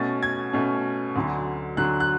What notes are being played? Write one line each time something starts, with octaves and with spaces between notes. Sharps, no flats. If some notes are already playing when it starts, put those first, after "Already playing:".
Already playing: B2 A3 C#4 A6
G#6
B2 A3 C#4
D2 D3 F#3
D2 D3 F#3 F#6
F#6